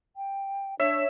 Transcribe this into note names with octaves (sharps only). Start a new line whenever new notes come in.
G5
D4 C#5 E5